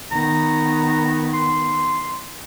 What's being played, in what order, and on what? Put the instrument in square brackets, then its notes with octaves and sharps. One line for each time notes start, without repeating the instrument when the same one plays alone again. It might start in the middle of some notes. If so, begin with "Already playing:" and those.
[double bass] D#3 B3 [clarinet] A#5
[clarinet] C6